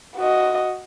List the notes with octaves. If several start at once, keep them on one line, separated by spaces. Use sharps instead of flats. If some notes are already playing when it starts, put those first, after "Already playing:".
F#4 D#5